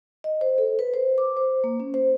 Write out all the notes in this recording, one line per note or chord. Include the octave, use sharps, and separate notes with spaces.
D#5
C5
A4
B4
C5
D6
C5
A#3
C#4
C5